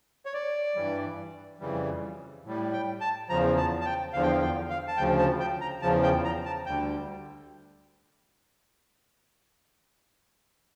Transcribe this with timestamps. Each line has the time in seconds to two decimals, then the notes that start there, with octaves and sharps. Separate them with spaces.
0.26 C#5
0.34 D5
0.75 G2 E3 G3
1.60 F2 C#3 E3 G3
2.45 A2 G3
2.73 G5
3.01 A5
3.29 E2 C#3 F3 A#5
3.57 A5
3.81 A5
3.86 G5
4.13 E2 D3 F3 F5
4.23 G5
4.32 F5
4.42 G5
4.70 F5
4.88 A5
4.97 D2 C#3 F3 G5
5.18 A5
5.40 G5
5.61 A#5
5.82 E2 C#3 F3 A5
6.03 G5
6.24 A#5
6.46 A5
6.66 D2 D3 G3 G5